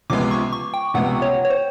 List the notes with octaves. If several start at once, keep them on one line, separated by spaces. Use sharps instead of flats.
C#2 C3 F3 G#3 B3 D6
C#6
C#6
G5
C#2 C3 F3 G#3 B3 F#5
C#5
C#5
C5